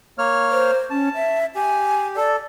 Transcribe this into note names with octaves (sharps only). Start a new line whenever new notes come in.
A#3 C#5 F6
C5
C#4 A5
E5
G4 G#5
A4 D5